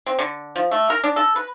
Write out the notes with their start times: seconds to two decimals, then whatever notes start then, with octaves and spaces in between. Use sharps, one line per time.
0.06 C4
0.19 D3
0.56 F3
0.71 A3
0.90 A#4
1.04 D4
1.16 A4
1.36 B4